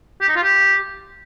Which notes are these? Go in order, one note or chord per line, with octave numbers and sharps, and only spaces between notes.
G4
D#4
F4
G4